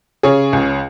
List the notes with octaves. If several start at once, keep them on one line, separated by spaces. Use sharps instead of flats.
C#3 G#4 C#5
C#2